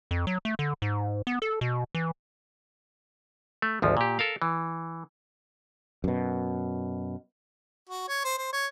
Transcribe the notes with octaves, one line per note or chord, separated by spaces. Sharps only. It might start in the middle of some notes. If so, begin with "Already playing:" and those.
F2
F#3
A3
D3
G#2
B3
A4
B2
E3
A3
G#1 D2 F3
A#2 G4
A4 A#4 F5
E3
F#2 B2
F#4
C#5
C5
C5
C#5